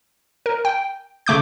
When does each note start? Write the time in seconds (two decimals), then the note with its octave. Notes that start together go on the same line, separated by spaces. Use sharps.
0.46 A#4
0.65 G5
1.27 C#3 A3 D6 G6